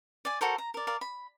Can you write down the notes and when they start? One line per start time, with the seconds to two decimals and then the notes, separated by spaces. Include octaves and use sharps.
0.25 D5 G#5
0.41 F#4 A4 A#4 C5
0.58 A#5
0.74 A#4 D5
0.87 A#4 D5 F5
1.01 B5